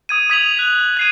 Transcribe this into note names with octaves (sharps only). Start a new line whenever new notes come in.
D#6 G#6 D#7
D#6 G#6 B6 D#7 F7 F#7
F#6 B6
G#6 C7 D#7